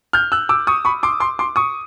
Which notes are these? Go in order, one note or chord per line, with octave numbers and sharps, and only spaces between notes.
F6 G6
E6 F#6
D6 E6
C#6 D#6
B5 C#6
C6 D6
C6 D6
C6 D6
C#6 D#6